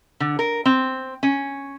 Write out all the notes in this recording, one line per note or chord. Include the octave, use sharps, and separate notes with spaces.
D3
A#4
C4
C#4